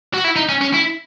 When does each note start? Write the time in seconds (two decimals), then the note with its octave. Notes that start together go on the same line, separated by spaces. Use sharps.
0.14 F#4
0.24 E4
0.36 D#4
0.49 C#4
0.62 C#4
0.74 E4